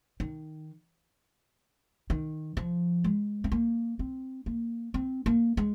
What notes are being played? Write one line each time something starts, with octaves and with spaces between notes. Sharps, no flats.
D#3
D#3
F3
G#3
C4
A#3
C4
A#3
C4
A#3
G#3